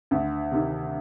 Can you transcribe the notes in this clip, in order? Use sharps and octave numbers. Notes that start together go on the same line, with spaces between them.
D2
C3 D#3